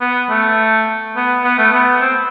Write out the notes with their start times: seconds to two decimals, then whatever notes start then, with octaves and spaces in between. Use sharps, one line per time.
0.01 B3
0.29 A3
1.16 B3
1.44 B3
1.58 A3
1.73 B3
2.01 C4